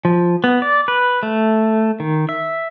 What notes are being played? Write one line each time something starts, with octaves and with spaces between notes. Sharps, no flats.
F3
B3
D5
B4
A3
D#3
E5